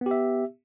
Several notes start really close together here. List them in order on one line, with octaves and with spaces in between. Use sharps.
B3 G4 E5